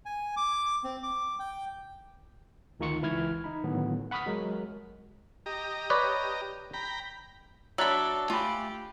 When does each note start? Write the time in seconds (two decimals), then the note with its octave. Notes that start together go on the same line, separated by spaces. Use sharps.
0.05 G#5
0.37 D6
0.84 C4
1.03 D6
1.39 G5
2.80 D2 D#3 D#4 F4 C#6 C#7
3.02 C#2 E3 E4 F6 G#6
3.44 D#4 B5
3.64 A2 D3 D#3 F#3 B3
4.11 F#5 B5 C#6 D#6 F6 B6
4.26 F#3 G#3 A#4
5.46 G4 D#5 A#5
5.90 B4 C#5 D5
6.74 G5 A#5 B5
7.78 F#3 D4 A4 D5 E5 B5 E6 F#6
8.30 A3 F4 G4 G#5 B5